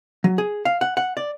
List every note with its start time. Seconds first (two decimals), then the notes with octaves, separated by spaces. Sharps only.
0.24 F#3
0.38 G#4
0.65 F5
0.81 F#5
0.97 F#5
1.17 D5